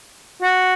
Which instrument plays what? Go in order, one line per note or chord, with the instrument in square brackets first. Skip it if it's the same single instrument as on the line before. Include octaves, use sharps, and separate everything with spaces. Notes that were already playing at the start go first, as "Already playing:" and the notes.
[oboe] F#4